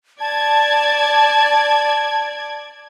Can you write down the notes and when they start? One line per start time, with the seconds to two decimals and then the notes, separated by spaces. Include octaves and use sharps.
0.20 D5 A5 G#6